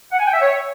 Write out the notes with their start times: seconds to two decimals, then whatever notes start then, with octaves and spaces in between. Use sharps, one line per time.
0.11 F#5
0.18 G#5
0.26 G5
0.33 E5
0.40 C#5